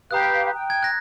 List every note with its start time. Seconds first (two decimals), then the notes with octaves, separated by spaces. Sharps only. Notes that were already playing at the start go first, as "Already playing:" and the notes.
0.11 G4 B4 F5 A#5 D#6 F#6
0.55 G5
0.70 G#6
0.83 F#6 A#6